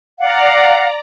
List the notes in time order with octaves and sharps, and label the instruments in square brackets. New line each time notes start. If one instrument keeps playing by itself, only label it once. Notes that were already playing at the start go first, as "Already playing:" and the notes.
[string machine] D5 A#5 [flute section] F5 F#5